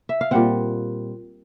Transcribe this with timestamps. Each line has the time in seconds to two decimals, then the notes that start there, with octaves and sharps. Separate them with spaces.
0.09 E5
0.21 F5
0.31 A#2 G3 C4 F#5